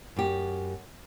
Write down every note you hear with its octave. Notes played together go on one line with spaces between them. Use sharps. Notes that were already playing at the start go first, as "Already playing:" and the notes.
F#2 G4